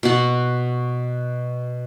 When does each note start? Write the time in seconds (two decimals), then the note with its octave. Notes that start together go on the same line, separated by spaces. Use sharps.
0.03 B2 F#4